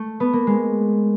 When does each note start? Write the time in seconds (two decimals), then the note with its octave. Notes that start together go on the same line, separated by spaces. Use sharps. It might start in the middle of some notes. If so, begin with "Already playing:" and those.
Already playing: A3
0.20 B3
0.33 A#3
0.47 G#3